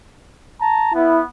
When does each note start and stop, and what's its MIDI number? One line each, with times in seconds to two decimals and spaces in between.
0.59 0.92 81
0.59 0.92 82
0.94 1.26 59
0.94 1.21 64